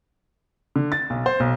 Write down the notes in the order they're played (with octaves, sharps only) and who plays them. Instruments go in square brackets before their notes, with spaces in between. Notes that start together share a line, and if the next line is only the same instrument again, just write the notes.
[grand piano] D3
A6
B1
C5
B1